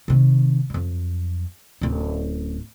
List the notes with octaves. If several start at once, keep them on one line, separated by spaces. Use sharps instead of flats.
C3 D#3
F2 F#3
D1 C#4